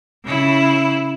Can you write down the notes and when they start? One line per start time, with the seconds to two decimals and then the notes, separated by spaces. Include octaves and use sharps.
0.25 C#3 E4